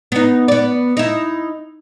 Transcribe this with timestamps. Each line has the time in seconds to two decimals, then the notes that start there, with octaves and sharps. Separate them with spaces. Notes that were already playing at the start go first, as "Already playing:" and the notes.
0.12 B3 D#4
0.48 B3 D5
0.97 D#4 E4